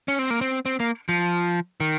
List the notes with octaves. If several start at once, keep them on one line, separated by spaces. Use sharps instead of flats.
C#4
C4
A#3
C4
C4
A#3
F3
D#3